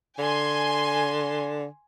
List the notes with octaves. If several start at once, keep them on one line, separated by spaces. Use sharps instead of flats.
D3 G#5 C6